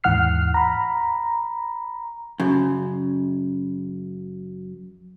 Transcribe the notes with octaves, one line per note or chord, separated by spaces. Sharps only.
D#2 G#2 E3 F#5 F6 C7
A#5 B5
F#2 C#3